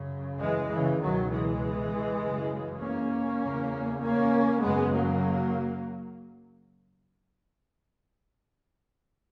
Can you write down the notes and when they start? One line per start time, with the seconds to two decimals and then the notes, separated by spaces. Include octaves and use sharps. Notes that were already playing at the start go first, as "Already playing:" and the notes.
Already playing: F#2 C#3
0.40 E3 G#3
0.70 C#3 E3
1.00 C#2 B2 D#3 F#3
1.30 E3 G#3
2.21 F#2 C#3
2.81 A#3 C#4
3.41 E2 C#3
4.01 A#3 C#4
4.62 F#2 C#3 G#3 B3
4.92 F#3 A#3